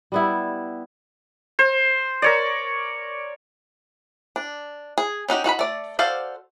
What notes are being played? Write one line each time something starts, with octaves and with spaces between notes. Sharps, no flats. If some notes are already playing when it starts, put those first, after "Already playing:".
G3 B3 E4
C5
A#4 C#5 D5
D4
G#4
C#4 D#4 F#4 G4
D#4 F#4 F5 B5
A3 D5
F#4 A4 C5 D5 F5